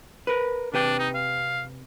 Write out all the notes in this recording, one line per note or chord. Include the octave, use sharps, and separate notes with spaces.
A#4 B4
C3 D4 B4 G5
D#4
F5